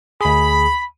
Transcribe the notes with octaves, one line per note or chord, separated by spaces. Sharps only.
D2 G#4 B5